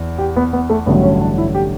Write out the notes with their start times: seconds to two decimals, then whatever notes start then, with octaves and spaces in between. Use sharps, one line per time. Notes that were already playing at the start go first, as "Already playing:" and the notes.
Already playing: E2
0.18 G4
0.36 B3
0.53 B3
0.70 A3
0.86 A1 G2 D3 F#3 B3
1.03 C#4
1.21 D4
1.38 E4
1.54 G4